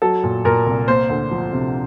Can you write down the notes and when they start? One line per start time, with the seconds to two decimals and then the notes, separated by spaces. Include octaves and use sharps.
0.02 F#3 A4
0.24 A#2
0.45 A#2 A#4
0.67 C2
0.88 A#3 C5
1.09 D2
1.31 F3
1.53 C3